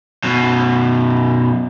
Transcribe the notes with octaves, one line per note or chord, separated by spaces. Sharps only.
F#2 B2